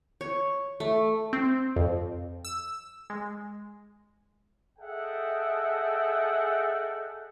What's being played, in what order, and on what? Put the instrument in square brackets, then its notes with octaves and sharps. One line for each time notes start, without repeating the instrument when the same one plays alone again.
[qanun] C#5
A3
[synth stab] C4
F2
E6
G#3
[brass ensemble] G#4 A4 D#5 E5 F#5 G5